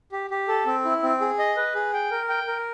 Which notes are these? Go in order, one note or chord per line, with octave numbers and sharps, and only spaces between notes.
G4
G4
A4
C4
E4
C4
G#4
D#5
B4
G#4
G5
A#4
G5
A#4